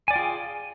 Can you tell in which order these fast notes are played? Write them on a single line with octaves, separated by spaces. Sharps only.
G#5 D5 G5 F4 G#4